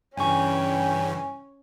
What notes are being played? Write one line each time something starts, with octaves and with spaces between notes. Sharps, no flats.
G2 C#3 E3 C#4 G5 G#5 C#6